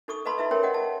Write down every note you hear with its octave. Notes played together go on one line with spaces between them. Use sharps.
D#4 A4 C#6 D#6
B4 D#5 F5 A5 B5 C6
D#4 E4 B4 E5
C#4 G#4 A#4 C#5 G5 C6
D#5 F#5 G5
A5